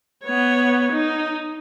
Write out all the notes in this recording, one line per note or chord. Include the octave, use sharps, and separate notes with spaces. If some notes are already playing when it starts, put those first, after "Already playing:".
B3 C#5
D#4